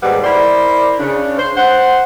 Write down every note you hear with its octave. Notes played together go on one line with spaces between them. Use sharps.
D#2 G#2 G3 B4 D5 F#5
E4 A#4 C5 D5
C#3 D4
C5
C5 F#5